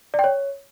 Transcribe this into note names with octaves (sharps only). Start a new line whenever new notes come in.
D5
G5
C#5